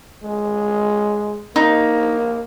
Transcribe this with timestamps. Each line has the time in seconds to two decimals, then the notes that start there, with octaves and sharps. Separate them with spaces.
0.24 G#3
1.56 A#3 D#4